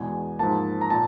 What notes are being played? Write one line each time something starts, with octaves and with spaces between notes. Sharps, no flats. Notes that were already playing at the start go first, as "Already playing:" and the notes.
Already playing: E2 B2 G#3 B3 G#5
G#2 F3 A#3 A5
A#5
A#2 A5